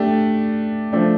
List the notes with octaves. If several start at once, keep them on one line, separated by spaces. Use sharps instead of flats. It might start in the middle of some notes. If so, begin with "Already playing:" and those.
Already playing: A3 D4 G4 D5
F3 A3 D4